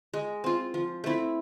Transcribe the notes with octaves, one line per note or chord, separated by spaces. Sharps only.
G#3
C4 F4
F3
A3 C4 E4